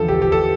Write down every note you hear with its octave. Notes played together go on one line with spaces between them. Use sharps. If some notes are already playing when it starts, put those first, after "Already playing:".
Already playing: E2 D3 F3 A4
G4
G4
A4